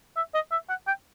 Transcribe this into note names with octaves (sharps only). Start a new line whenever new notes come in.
E5
D#5
E5
F#5
G5